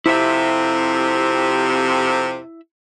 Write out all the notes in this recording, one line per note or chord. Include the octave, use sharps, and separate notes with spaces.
F2 C3 E4 E5